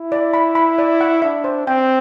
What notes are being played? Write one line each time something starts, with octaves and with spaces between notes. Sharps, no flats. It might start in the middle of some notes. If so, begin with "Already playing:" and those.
Already playing: E4
D5
B5
B5
D5
F#5
D4 E5
C5
C4 G5